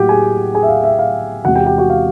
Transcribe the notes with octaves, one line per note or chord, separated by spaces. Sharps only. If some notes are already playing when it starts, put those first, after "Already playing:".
Already playing: A2 F#3 A#3 F#4 G4 F#5 G5
G#4 G#5
G#4 G#5
E5
F5
E5
F5
E2 C3 E3 G#3 C4 F#4 F#5
G4 G5
G4 G5
F#4 F#5
F5